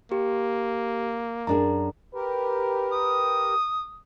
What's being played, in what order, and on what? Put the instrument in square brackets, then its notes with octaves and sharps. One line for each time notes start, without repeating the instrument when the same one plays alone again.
[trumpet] A#3 [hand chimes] G4
[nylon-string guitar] F#2 D4 G#4 [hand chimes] A#5
[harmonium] G4 A#4 [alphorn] B4
[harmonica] D#6